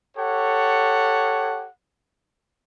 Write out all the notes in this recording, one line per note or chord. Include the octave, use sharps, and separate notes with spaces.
G4 A4 C#5 F#5